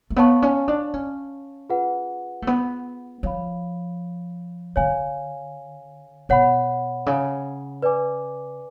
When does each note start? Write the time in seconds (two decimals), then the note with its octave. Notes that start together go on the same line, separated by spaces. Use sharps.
0.10 A3
0.16 B3 C#5 F5 A5 C#6
0.42 C#4
0.68 D4
0.94 C#4
1.70 F4 G#4 B4 F#5
2.42 A3
2.47 B3
3.23 F3 C#5 F5 B5
4.76 D3 C#5 F5 G#5
6.29 B2 C#5 F#5 B5
7.06 C#3
7.82 B4 D5 G#5 D6